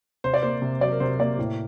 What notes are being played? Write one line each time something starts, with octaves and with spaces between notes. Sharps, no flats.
C3 C5
D5
A#3 C5
C3
F#3 D5
A#4
C3 C5
A#3 D5
A2